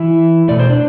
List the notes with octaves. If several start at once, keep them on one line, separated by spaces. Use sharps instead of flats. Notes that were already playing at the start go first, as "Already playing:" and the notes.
Already playing: E3 E4
B2 A3 D5
C5
D4 D5